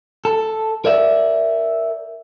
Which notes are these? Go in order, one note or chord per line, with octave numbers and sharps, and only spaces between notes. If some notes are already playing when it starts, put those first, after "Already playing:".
A4
A#4 D5 E5